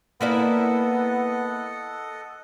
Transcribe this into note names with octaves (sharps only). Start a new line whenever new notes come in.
A#3 B3 E4 A4 D5 D#5 F#5